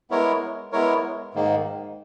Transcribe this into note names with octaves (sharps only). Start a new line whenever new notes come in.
G#3 B3 E4 A#4 C#5
G#3 B3 E4 A#4 C#5
G#2 D#3 A#3